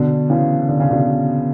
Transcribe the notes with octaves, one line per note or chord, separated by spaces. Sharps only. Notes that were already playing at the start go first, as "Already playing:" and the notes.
Already playing: B2 D3
C#3 E3
D3
C#3
B2 D3